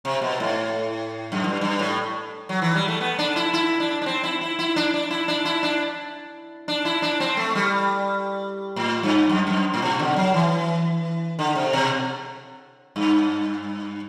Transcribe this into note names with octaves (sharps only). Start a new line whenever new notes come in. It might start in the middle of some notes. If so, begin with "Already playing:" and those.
C3
B2
A2
F#2
G2
G2
A2
F#3
E3
G3
A3
B3
D4
E4
E4
D4
D4
C4
E4
E4
E4
D4
D4
E4
D4
E4
D4
D4
E4
D4
C4
A3
G3
A2
G2
F#2
F#2
A2
B2
D3
F#3
E3
D3
C3
B2
G2